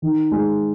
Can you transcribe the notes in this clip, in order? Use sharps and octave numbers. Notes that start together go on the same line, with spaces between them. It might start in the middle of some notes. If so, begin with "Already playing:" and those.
D#3
G#3